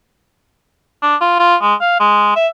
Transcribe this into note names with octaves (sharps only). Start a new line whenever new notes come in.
D4
F4
F4
G#3
F5
G#3
E5